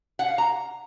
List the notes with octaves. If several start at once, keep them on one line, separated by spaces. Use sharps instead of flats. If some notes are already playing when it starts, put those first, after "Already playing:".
F#5
F5
A#5